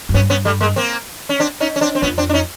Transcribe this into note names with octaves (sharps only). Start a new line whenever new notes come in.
F#2
G2 B3 C#4
B3 C#4
G3 A3
G#3 A#3
A#3 C4
C#4
C4 D4
C#4 D#4
C#4
C4 D4
C4
F2 B3 C#4
C4 D4
D4
C#4 D#4